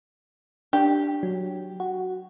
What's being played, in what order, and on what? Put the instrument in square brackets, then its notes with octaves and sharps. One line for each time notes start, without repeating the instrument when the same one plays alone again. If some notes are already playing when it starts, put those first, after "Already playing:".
[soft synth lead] D4 [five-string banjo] G4
[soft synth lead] F#3
F#4